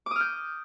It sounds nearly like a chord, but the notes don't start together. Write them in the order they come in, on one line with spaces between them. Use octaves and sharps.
D6 D#6 F6 G6